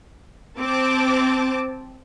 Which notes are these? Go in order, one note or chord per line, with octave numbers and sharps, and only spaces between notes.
C4 A5 D6